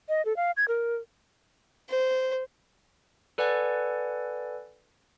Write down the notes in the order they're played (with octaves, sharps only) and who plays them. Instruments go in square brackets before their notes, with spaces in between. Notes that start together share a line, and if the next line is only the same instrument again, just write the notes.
[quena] D#5
A4
F5
G#6
A#4
[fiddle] C5
[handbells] A4 B4 D5 F#5 G#5